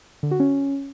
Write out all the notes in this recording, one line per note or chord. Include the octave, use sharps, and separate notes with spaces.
D3
F#4
C#4